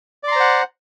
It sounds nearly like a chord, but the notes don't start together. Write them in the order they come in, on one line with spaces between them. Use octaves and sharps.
D5 C6 A#5 C5 F#5